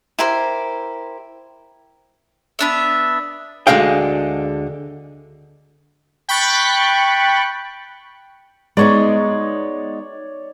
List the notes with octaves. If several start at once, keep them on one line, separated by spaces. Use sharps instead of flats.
E4 G4 A#4 C5
B3 D4 E5
D2 D3 G#3 F5 G5
G5 B5 C#6 F#6 A6
G#3 B3 D#4 C#5 D5